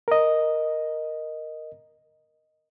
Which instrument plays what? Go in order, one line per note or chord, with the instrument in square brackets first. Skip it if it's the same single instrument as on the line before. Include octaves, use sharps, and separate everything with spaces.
[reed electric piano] A#4 D#5